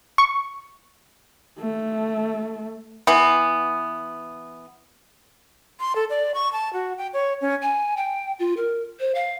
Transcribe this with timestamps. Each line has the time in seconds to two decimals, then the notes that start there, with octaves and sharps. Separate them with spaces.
0.18 C#6
1.59 A3
3.07 E3 B3
5.80 C6
5.96 A4
6.10 D5
6.34 C#6
6.53 A5
6.73 F#4
6.98 G5
7.13 C#5
7.41 C#4
7.62 G#5
7.97 G5
8.39 F4
8.57 A#4
9.00 C5
9.15 F5